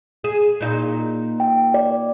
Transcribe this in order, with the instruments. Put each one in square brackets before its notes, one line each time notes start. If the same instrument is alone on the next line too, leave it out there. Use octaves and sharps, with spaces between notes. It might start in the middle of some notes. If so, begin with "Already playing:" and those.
[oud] G#4
A#2 D#4
[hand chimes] G5
D5